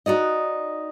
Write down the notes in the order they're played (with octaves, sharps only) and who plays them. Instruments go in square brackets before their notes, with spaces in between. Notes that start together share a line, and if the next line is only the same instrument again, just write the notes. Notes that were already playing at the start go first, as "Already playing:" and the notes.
[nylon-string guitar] D#4 F#4 D5 D#5